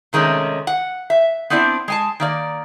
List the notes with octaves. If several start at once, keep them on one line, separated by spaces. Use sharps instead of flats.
C3 D#3 G#3 A3 C#4
F#5
E5
B3 C4 D4 E4 D5
G#3 G#5 A5
D#3 A#3 D5